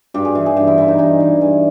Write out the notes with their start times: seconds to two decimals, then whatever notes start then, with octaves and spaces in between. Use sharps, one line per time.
0.14 G2 G4
0.25 G#4
0.35 E3
0.46 G#4
0.56 G2 G4
0.67 E4
0.78 E3 E4
0.88 D#4
0.98 G2 D#4
1.20 E3 E4
1.41 G2 G#4